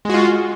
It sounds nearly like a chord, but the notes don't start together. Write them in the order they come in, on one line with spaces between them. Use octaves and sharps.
G#3 F#4 F4